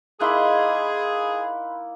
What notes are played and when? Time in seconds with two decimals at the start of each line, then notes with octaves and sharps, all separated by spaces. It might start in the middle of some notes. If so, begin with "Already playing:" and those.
0.21 A#3 D#4 E4 G#4 B5 C6 F#6